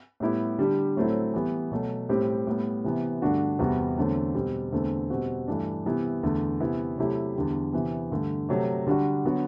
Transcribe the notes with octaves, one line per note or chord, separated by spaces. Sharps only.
A2 G3 B3 E4 G4
D3 G3 D4 G4
A2 F#3 A3 C4 E4
E3 G3 B3
B2 F#3 A3
A2 G3 C4 G4
A2 G3 B3
C3 E3 B3
G2 D3 A3 D4 F#4
E2 C3 G3 B3 F#4
E2 D3 F#3 A3 C4
B2 G3 C4
E2 D3 A3 C4
B2 G3 C4 F#4
G2 E3 A3 D4
C3 E3 G3 B3 E4
E2 D3 A3
C3 E3 B3 E4
C3 F#3 A3 E4 G4
E2 D3 G3
C3 E3 B3
G2 D3 A3
C3 F#3 A3
D3 G3 D4 F#4
D3 F#3 B3 F#4